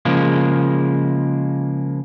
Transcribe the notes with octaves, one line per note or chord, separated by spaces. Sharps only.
C#3 F3 G#3 A#3